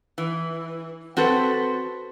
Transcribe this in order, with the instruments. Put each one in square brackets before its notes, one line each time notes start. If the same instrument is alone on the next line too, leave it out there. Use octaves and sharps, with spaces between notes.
[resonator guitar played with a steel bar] E3
C4 F#4 A4 B4